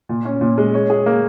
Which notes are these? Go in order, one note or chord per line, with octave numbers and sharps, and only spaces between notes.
A#2
C#4
A#2
G#3
C#5
G#4
A#3